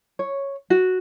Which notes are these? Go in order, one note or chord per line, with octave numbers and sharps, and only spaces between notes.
C#5
F#4